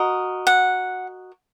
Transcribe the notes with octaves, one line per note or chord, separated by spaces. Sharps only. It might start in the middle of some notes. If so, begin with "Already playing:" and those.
Already playing: F#4 A#4 D#5
F#5